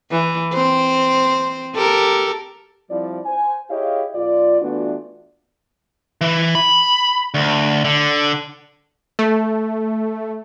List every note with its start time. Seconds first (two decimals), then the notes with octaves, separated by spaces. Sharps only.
0.11 E3
0.53 C4 C5
1.75 G4 A4 A#4
2.90 F3 G3 C4 E4 D5
3.26 C5 G#5
3.70 E4 G4 G#4 C#5 D#5 F5
4.15 B1 F4 D5
4.62 E3 A3 B3 D4 F4 F#4
6.21 E3
6.55 B5
7.34 D2
7.84 D3
9.19 A3